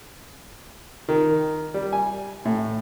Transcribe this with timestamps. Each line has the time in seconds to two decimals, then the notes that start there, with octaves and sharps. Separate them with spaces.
1.09 D#3
1.74 G3
1.93 G#5
2.45 A2